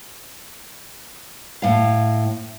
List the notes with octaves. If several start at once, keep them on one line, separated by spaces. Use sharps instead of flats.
A2 F5